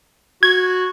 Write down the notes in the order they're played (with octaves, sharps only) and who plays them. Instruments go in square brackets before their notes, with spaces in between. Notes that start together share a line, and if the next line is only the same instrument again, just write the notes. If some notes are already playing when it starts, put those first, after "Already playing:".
[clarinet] F#4 [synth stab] G#6